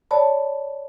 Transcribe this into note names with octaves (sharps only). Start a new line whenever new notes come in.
C#5 D5 A5 B5